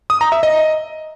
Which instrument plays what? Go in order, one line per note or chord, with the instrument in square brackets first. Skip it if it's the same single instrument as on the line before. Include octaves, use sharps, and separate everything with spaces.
[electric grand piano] D#6
A#5
E5
D#5